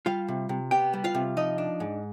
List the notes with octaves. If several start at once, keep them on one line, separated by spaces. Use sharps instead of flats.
G3 F4 F5
C3
C3
B3 G4 G5
G3
F4 F5
C3
F3 D#4 D#5
D4
G#2